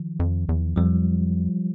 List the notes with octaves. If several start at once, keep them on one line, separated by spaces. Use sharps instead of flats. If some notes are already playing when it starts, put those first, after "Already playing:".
Already playing: D#3 F3
F2
E2
F2 F3 G3